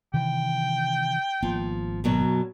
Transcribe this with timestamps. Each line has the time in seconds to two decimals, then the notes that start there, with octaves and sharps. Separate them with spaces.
0.14 C3 D#3 E3 G5
1.43 G#1 F3 A#3 B3
2.04 F#2 B2 F#3